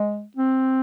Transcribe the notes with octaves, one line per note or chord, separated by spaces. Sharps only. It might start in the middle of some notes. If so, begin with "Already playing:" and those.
Already playing: G#3
C4